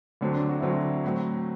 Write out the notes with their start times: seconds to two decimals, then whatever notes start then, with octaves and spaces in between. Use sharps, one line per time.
0.21 D2 D3 F#3 C4 D4
0.35 D4
0.49 F#4
0.59 D2 D3 F#3 C4 E4
0.69 F#4
1.04 A2 F#3 C4